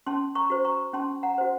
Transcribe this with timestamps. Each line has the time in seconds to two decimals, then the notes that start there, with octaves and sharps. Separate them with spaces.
0.06 C#4 A5 C6
0.35 A#5 C#6
0.50 F#4 C5
0.64 A#5 C#6
0.93 C#4 A5 C6
1.23 F#5 A#5
1.38 F#4 C5